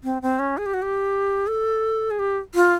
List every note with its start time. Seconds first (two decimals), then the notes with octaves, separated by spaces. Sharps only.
0.04 C4
0.22 C4
0.39 C#4
0.57 G#4
0.66 G4
0.74 F#4
0.82 G4
1.47 A4
2.11 G#4
2.19 G4
2.55 F4